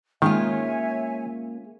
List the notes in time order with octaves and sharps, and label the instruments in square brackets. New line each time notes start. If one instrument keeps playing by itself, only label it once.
[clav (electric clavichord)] D#3 [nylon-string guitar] G#3 C#4 F4 [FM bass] A#3 [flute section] C#5 E5 G#5